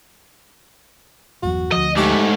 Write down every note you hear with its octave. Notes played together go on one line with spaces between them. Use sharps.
G1 E2 F#3 F#4
D2 F3 D#5
G#2 A3 G4